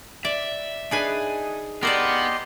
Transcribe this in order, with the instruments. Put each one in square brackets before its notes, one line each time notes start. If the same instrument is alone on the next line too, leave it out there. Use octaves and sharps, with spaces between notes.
[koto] D5 [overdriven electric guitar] E5
[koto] D4 B4 G#5 [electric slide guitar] D#4 G#4
[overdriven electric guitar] B3 [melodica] G4 D#5 C6 [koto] A#4 C5 D5